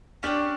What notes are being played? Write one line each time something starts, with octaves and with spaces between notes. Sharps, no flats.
C#4 D4 G4 D5 G5